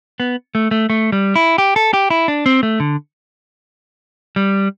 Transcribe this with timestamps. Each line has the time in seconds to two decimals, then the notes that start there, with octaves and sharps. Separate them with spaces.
0.20 B3
0.55 A3
0.71 A3
0.90 A3
1.12 G3
1.36 E4
1.58 G4
1.76 A4
1.93 G4
2.10 E4
2.28 D4
2.46 C4
2.63 A3
2.80 D3
4.36 G3